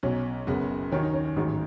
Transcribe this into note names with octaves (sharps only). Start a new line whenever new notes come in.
B1 B2 F#3 C#4
F#1 F#2 C#3 B3
D#2 D#3 F#3 C#4
D#4
C#4
C#4
A1 G#2 D#3 F#3